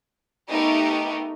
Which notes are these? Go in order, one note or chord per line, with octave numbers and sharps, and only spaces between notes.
A3 B3 D#4 G4 A#4